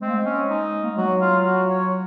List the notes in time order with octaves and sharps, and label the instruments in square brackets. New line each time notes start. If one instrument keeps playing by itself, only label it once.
[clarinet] G#3 [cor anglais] C4
[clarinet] A#3
G#3
[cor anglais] C#4
D#4
[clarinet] A#3
G#3
[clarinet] F#3 [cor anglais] F#4
[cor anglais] F4
F#4
C#5